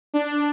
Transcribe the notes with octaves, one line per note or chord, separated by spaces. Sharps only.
D4